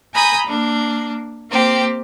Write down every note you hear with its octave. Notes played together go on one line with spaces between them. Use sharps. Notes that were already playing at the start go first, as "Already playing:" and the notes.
G#5 A#5 B5 D#6 G6
A#3 D4
A#3 C4 G4